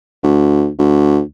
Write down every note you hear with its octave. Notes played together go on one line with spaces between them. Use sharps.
D2
D2